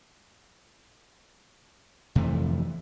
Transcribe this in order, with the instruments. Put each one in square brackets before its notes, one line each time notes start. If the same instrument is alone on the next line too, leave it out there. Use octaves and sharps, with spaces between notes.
[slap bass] F2 C3 E3 A3